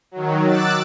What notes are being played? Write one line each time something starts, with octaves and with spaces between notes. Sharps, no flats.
D#3 F#3
D6 E6 F#6 A6